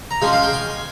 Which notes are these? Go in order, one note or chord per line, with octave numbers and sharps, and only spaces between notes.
A#5
F3 G#3 C#4 G#5
F5
G5
G#5